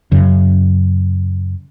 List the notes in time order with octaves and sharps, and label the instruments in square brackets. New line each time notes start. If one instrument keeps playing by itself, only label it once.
[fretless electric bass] F#2 C#3